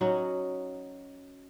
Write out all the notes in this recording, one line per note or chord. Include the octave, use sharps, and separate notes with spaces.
F#3 C#4 D#4 F#4